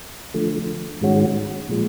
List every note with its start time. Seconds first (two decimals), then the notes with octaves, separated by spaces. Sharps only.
0.34 D3 F3 A3
1.01 G#2 D#3 G#3 C#4 F#4
1.69 A#2 F3 G#3